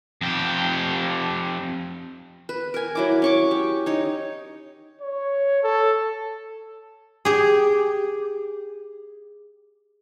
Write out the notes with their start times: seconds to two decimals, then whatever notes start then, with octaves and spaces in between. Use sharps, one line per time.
0.22 F2 G4
2.49 B4
2.74 A#4 G#5
2.95 F#3 E4 D6
3.22 C#4 C#6 D6
3.51 G4
3.86 D#4 C#5
5.01 C#5
5.63 A4
7.25 G4 G#4